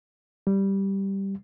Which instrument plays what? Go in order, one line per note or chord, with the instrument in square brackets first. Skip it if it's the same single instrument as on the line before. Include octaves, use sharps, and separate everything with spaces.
[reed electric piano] G3